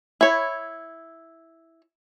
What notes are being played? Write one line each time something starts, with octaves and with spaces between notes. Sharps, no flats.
E4 C#5